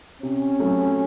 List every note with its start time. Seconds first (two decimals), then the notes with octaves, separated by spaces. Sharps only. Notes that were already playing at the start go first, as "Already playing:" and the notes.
0.22 C3 C#4
0.60 F#3 A3